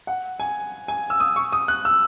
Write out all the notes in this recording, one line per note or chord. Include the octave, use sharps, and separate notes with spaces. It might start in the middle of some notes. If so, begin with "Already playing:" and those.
F#5
G#5
G#5
E6
D#6
C#6
D#6
F#6
E6